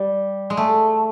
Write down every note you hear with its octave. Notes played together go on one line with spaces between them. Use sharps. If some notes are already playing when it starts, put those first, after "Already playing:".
Already playing: G3
G#3
A3